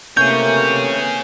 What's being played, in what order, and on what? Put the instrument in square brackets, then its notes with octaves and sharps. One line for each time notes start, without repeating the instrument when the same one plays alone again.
[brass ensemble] C3 A#3 [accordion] E3 A3 C#4 [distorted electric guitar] G#4 C#5 [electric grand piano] G6